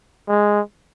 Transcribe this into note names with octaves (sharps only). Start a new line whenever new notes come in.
G#3